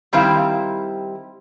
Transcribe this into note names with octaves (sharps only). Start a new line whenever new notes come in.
D#3 G3 C4 E4 F5